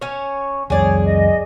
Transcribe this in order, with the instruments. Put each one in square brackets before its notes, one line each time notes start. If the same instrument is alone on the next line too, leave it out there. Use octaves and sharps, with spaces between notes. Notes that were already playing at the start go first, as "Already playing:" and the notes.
[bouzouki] C#4 C#5
[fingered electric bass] C#2 F#2 [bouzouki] G#4 D5 [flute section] C#5
[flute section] D#5